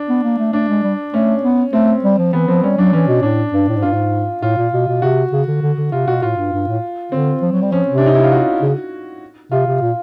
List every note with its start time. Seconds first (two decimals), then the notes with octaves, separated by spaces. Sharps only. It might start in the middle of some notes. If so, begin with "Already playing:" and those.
Already playing: D4
0.09 B3
0.24 A#3
0.38 A3
0.53 A3 D4
0.68 G#3
0.84 G3
1.14 A3 C#4
1.43 B3
1.73 A3 C4
2.04 G3
2.18 F3
2.33 E3 B3
2.48 F3 C4
2.63 G3 C#4
2.78 F#3 D4
2.93 E3 C#4
3.08 B2
3.23 A2 D4
3.53 G2
3.68 A2
3.77 G#2
3.82 G2 F4
3.94 G#2
4.42 A2 F4
4.58 A#2
4.73 B2
4.88 B2
5.02 C3 F#4
5.32 C#3
5.48 D3
5.62 D3
5.78 D3
5.92 C3 F4
6.08 B2 F#4
6.22 A2 F4
6.37 G2
6.53 G2
6.68 A2
7.12 D3 C4
7.42 F3
7.52 F#3
7.62 G3
7.72 F3 C#4
7.88 C3
7.98 D4
8.06 D#4
8.15 E4
8.24 F4
8.32 F#4
8.62 C#3
9.51 C3 F4
9.67 C3
9.82 A#2